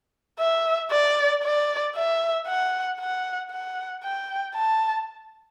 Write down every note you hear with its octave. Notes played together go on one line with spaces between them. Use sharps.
E5
D5
D5
E5
F#5
F#5
F#5
G5
A5